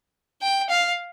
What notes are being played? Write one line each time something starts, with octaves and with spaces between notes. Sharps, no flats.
G5
F5